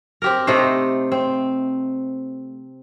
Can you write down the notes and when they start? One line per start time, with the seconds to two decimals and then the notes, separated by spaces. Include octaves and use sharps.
0.22 C4 G4 A#4
0.47 C3 A3 D#4 C5
1.12 C4